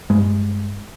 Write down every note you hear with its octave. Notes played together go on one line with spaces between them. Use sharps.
G2 G#3